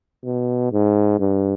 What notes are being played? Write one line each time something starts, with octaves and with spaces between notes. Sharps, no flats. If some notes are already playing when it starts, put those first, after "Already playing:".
B2
G#2
G2